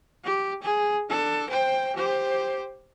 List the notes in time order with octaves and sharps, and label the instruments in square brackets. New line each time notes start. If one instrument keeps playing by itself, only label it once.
[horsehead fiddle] G4
G#4
D4 A4
C5 G5
G4 C5